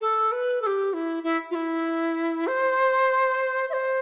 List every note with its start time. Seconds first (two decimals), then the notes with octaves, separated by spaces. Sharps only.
0.01 A4
0.32 B4
0.62 A4
0.66 G4
0.93 E4
1.23 E4
1.51 F4
1.55 E4
2.47 C5
3.70 E5
3.73 C5